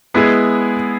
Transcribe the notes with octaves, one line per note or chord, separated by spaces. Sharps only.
G#3 B3 E4 G#4